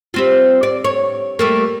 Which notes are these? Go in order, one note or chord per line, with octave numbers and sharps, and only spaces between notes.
G3 C4 F4
D5
C#5
G3 A3 A#3